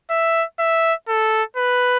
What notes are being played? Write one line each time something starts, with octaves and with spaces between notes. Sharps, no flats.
E5
E5
A4
B4